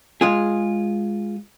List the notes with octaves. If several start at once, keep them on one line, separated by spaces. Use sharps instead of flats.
G#3 F4 G#4